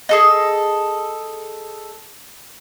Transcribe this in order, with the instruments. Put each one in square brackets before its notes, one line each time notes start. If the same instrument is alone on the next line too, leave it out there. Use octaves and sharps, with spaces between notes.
[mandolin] G#4 A4 D#5